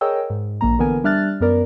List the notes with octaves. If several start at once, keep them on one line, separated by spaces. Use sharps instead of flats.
G#4 A#4 C#5 D#5 G5 E6
G#2
A#1 A#3 A#5
D3 E3 B3 A#4 G#5
G3 D4 E5 F6 F#6 A6
F#2 B3 A#4 D5